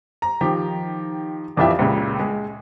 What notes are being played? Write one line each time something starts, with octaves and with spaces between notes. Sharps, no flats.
A#5
D#3 F3 G4
A#1 F2 E3 F4 G4 E5
C#2 A#2 C#3
G#3